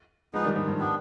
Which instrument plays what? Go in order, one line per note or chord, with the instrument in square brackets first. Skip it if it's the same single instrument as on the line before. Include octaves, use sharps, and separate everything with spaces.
[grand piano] F3 G#3 [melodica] B3 D#4 G#4 B4
[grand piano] D#3 G3
G#2
G2
[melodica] G3 B3 D4